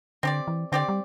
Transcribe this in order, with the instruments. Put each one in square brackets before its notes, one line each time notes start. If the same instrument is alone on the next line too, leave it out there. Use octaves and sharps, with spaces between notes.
[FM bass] D3 [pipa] C4 G4 D5
[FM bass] E3
[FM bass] D3 [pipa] C4 G4 D5
[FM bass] G3